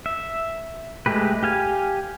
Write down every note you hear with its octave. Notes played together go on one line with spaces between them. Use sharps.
E5
G#3 A3 G4 B4
G4 F5 G#5